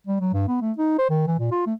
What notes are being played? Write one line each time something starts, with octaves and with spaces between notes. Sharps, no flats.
G3
F#3
G2
B3
A3
D#4
C5
D#3
E3
A#2
F4
A3